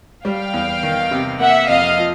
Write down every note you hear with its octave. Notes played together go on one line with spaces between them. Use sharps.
G3 F5 G5
E2
D#3
C3
A#3 E5 F#5
F2 D#5 F5
F3